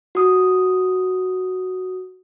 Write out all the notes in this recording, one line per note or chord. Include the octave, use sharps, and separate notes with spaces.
F#4 D#6